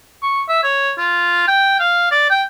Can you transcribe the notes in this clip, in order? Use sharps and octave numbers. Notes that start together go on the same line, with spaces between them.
C#6
E5
C#5
F4
G5
F5
D5
G5